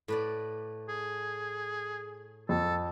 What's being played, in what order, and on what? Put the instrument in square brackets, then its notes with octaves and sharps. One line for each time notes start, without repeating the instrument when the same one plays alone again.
[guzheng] A2 B4 D5
[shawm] G#4
[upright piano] F2 [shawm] A4